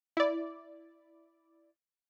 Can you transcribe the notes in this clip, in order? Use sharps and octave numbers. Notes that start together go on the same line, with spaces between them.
E4 D5